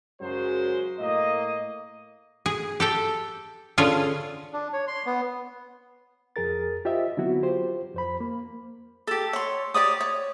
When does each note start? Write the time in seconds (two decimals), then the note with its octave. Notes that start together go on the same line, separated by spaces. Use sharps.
0.21 F#2 C#3 F#3 G#3 C5
0.99 A2 A#3 D#5
2.46 G#4
2.80 G4 A4 G5
3.78 D3 C#4 F4 G#4
4.53 D4
4.73 C#5
4.87 C6
5.06 B3
6.36 F2 G#4 A#4 A6
6.85 F4 G4 C5 D#5 E5
7.17 D3 F#3 B3 C4 E4 F#4
7.43 F4 G4 C5
7.94 F2 C5 B5
8.20 A#3
9.07 G4 A4
9.33 C#5 C6
9.74 G4 C#5 D5 D#6
10.01 C#5